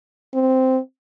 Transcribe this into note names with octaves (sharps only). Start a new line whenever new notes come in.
C4